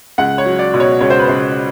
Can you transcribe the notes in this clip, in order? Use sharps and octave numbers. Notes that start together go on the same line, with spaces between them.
C#2 F#5
C#5
F#3
D5
B2
C#5
C#2 C#5
C5
B4
C#2 C5